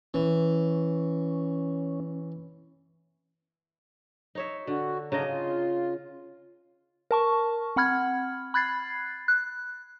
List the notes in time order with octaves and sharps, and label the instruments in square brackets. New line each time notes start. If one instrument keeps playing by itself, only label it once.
[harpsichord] E3 [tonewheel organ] C#4
[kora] D#4 C#5 E5
[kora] D3 [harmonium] F#4
[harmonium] G#2 D4 A#5 [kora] C#3 D#5
[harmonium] F4
[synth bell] A#4 A5 C#6
C4 F#5 B5 F6 G#6
B5 F#6 G#6 A6 C7
F#6